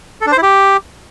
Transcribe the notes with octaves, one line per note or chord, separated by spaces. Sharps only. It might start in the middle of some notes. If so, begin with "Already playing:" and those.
A4
D4
C5
E4
G4